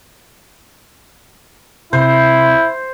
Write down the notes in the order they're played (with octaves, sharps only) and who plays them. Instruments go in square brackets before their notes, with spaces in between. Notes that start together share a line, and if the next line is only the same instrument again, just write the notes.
[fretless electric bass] C3 [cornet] E4 [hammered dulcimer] C5